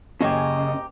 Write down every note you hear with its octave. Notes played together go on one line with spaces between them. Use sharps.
F#1 C#3 G4 D#5 G#5 A#5